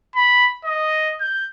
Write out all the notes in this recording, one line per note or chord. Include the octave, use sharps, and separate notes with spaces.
B5
D#5
G6